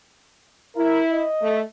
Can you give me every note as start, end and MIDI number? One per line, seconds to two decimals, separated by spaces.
0.76 1.24 64
0.76 1.03 70
1.12 1.63 75
1.42 1.59 57